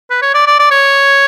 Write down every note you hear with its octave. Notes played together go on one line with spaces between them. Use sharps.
B4
C#5
D5
D5
D5
C#5